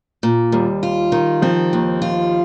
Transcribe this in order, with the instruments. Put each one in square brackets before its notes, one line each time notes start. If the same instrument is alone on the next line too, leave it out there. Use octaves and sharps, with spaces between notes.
[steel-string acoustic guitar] A#2
[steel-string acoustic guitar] D#2 [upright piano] G3
[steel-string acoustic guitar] F4
D#3
[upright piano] F3 [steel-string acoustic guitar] C4
[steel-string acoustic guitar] D#2
F4